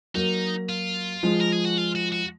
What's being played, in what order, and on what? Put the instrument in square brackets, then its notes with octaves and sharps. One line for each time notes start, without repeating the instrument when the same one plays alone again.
[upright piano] F#3 A#3 [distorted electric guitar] D#4
[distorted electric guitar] F4
[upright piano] F3 G#3
[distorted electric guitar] A#4
G#4
F#4
F4
F#4
F#4